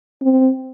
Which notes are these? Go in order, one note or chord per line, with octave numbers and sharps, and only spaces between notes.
C4